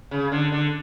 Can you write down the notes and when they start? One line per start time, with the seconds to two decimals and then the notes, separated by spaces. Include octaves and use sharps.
0.11 C#3
0.32 D3
0.52 D3